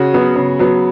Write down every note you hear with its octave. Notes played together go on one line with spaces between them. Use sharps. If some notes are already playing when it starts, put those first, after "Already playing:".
Already playing: C#3 F#4
F#3 B3
C#3
F#3 B3